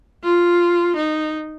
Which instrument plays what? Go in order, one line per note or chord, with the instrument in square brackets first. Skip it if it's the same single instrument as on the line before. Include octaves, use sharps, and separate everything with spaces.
[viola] F4
D#4